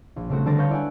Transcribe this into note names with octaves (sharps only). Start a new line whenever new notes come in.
A#1
C#3 G3 A3 C4 F#4
D3 G3 C5 A5 D6 A#6
B4 C#5 F5 G6 A6
E4 D5 F#5 G#5